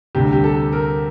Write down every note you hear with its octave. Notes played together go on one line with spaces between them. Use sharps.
D2 C3 G3 D4 G4
G4
A4
A#4